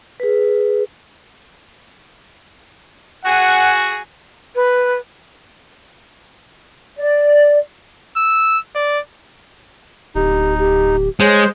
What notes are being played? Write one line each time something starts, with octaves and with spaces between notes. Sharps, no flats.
G#4 B4
F#4 G#4 F#5 G#5
B4
D5
E6
D5
D1 D#4 G4
G4
G#3 C5 C#5